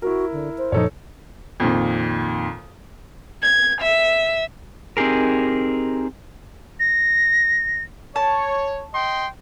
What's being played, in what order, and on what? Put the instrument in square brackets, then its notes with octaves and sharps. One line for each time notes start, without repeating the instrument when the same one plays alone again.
[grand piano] E4 A#4 [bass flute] F#4
[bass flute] D3
C5
[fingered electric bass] F#2 A#2 F3 [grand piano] D#4 A4 C#5
[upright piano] F2 A#2 D#3
[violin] G#6
E5
[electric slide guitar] C4 D#4 G4 G#4 A#4
[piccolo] A#6
[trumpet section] C#5 [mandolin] A5
[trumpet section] D#5 G5 C6